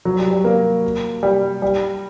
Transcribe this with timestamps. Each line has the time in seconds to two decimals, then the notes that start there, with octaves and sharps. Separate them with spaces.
0.05 F#3
0.19 G3
0.31 G3
0.44 A#3
1.23 G3
1.62 G3